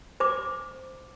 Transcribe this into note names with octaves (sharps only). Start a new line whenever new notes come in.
C5 D6